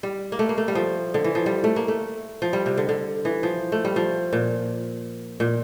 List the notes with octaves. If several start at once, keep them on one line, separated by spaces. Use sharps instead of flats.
G3
A#3
A3
A#3
A3
G3
F3
D3
E3
F3
G3
A3
A#3
A3
F3
G3
C3
D3
D3
E3
F3
A3
G3
F3
A#2
A#2